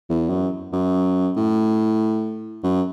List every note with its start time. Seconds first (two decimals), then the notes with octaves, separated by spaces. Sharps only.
0.10 E2
0.30 F#2
0.73 F#2
1.37 A2
2.63 F#2